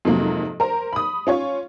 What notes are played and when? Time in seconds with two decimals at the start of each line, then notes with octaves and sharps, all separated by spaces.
0.05 F2 G#2 C3 F#3 A#3
0.60 A#4 C5 A#5
0.93 B5 D#6
1.27 C#4 F4 C#5